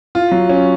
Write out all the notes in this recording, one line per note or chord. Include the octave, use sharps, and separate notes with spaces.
F4
F#3
C#4